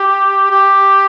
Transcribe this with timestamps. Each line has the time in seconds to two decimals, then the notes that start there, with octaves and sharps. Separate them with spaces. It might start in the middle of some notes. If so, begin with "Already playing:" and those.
Already playing: G4
0.51 G4